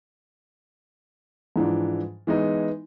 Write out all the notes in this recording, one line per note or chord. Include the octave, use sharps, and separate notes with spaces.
G#2 E3 F3 D4
E3 G#3 B3 D#4 E4